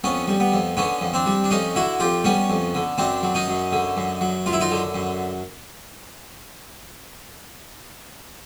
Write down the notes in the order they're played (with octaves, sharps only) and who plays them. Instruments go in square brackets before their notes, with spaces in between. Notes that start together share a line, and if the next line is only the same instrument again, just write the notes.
[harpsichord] F2 B3 C#4
G3
B3
F2
D3 B3 C#4
F2
C4 D4
G3
D4
F2 C#4 D#4
D3 E4 F#4
F2 F4 G4
G3 B3 C#4
F2
D3
F#2 C4 D4
F#3
C#4 D#4
F#2
D3
F#2
F#3
F#2 F4
E4
D#4 F4
D3
F#2